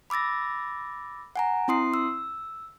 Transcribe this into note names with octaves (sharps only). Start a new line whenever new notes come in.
B5 D6 E6 A6 A#6
F#5 G#5 A#5
C4 E4 C6 D#6 C7
E6